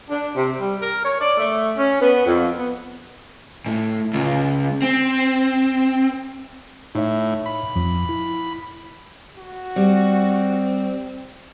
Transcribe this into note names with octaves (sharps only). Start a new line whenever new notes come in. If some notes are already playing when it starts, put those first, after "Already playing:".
D4
C3
G3
A#4
C#5
D5
A3
C#4
B3
F2
B3
A2
C#2
C4
A2 D#4 C#5 E5
B5
F2 F3
E4
F#4
G3 C4